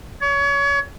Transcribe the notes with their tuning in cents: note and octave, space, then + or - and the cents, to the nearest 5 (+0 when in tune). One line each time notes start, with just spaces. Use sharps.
C#5 +30